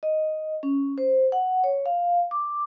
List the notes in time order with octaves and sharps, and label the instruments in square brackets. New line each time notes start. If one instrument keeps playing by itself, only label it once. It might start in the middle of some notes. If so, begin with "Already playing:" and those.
[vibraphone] D#5
C#4
C5
F#5
C#5
F5
D6